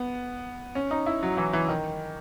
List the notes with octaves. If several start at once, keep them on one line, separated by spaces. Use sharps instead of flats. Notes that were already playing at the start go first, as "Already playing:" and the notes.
Already playing: B3
C#4
D#4
E4
F#3
E3
E3
D#3